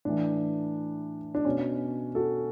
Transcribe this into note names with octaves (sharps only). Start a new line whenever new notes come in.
A2 E3 D4
D4
B2 C#4
F#4 A4